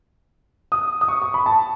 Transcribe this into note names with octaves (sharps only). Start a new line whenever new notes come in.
D#6
D#6
C#6
C#6
B5
A5